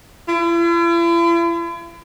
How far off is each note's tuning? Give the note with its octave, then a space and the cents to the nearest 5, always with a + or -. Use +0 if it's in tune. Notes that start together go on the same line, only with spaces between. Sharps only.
E4 +45